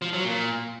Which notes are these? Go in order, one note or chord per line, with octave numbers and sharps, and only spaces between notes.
F3
F#3
A#2